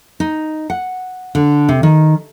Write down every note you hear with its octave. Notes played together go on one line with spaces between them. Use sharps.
D#4
F#5
D3
C3
D#3